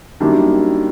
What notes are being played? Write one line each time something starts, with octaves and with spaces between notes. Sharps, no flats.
F#2 D#3 G3 A#3 D4